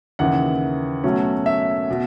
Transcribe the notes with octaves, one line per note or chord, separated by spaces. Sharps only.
D#2 C#3 E3 F#5
B2 F#3 A3 C#4
E5
B2